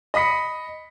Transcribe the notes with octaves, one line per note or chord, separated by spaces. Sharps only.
D#5 B5 D#6 B6 C#7